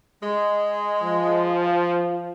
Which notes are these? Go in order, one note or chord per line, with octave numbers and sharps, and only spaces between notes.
G#3
F3